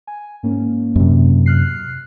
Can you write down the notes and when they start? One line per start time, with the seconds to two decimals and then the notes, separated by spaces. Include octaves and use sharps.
0.07 G#5
0.43 G#2 A#3 C#4
0.96 F#2 C3
1.46 F6 F#6 C7